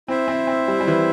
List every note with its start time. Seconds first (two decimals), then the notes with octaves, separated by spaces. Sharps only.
0.08 C4 E4 C5 E5
0.28 C4
0.47 C4
0.68 G3
0.80 G3
0.88 E3